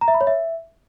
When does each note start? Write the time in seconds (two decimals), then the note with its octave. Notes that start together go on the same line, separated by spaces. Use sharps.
0.01 A#5
0.08 E5
0.14 B5
0.21 C#5
0.27 E5